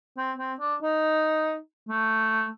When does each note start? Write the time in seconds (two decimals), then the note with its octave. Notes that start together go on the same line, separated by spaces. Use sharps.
0.17 C4
0.39 C4
0.60 D4
0.82 D#4
1.89 A3